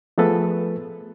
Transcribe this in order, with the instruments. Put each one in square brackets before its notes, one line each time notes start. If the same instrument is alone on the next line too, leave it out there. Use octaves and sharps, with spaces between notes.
[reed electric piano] F3 A3 B3 G#4 A4 B4